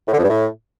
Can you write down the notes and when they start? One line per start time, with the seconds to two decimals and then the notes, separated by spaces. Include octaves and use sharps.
0.07 A2
0.13 D3
0.18 F2
0.23 G2
0.29 A2